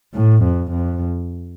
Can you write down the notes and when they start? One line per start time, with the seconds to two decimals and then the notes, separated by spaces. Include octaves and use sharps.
0.14 A2
0.44 F2
0.72 F2